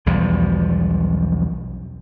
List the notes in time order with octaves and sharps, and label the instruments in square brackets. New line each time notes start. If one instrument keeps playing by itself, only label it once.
[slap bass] B1 E2 F3 G3